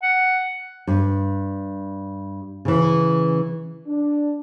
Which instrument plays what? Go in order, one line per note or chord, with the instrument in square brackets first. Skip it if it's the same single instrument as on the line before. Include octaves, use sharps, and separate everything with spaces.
[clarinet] F#5
[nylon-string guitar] G2
C#3 E3
[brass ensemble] D4